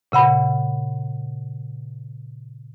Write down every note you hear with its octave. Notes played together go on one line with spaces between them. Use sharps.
A#2 C#3 F#5 B5